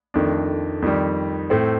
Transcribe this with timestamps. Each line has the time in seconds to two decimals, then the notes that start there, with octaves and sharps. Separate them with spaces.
0.14 F2 D#3 A3 D4
0.82 F2 D#3 G3
1.50 A2 A3 C4